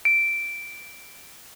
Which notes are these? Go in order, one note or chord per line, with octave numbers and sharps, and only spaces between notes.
D7